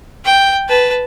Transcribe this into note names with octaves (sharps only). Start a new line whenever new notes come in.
G5
B4 A5